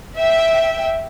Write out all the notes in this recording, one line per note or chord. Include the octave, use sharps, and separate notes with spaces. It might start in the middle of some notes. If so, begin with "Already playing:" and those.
E5 G5